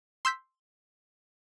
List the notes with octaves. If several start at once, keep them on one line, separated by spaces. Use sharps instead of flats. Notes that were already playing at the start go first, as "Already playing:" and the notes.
C6 E6 G6 B6